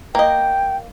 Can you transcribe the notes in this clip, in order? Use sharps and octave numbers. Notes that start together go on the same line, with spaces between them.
A#3 D#5 G5